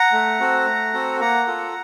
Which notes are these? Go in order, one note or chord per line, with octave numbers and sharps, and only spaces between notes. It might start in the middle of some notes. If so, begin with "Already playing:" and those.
Already playing: F#5 A#5
A3
C4 F#4 A4
A3
C4 F#4 A4
A#3 F#5 A#5
F4 A4